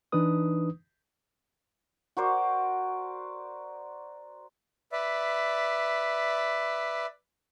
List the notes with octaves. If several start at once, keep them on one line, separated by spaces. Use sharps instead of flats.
E3 D4 D#4 B4 D#6
F#4 A#4 C5 D5
B4 D5 E5